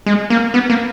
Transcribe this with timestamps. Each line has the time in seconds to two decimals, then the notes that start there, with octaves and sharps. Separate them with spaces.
0.06 G#3
0.30 A#3
0.54 B3
0.70 A#3